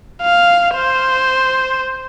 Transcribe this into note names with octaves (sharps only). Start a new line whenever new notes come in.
F5
C5